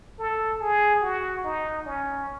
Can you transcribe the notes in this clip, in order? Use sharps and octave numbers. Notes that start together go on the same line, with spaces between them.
A4
G#4
F#4
D#4
C#4